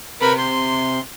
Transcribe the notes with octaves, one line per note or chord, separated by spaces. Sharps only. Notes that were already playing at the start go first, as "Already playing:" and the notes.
C3 A#4 B4 B5
C6